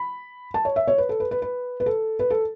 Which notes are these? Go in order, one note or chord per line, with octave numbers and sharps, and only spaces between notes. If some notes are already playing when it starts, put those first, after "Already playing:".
Already playing: B5
A5
C#5
E5
C#5
B4
A4
B4
B4
B4
B4
A4
B4
A4